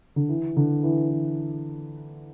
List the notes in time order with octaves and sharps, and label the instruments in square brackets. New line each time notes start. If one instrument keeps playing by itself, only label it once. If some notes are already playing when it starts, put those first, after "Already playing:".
[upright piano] D3
E3
D3
E3
E3